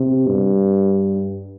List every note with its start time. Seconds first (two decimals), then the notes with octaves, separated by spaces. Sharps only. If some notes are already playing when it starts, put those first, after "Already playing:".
Already playing: C3
0.27 G2